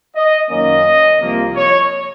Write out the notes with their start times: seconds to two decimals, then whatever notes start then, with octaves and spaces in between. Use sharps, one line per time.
0.16 D#5
0.50 F#2 D#3 A#3 C#4 D#5
1.20 C2 C3 F3 A#3
1.56 C#5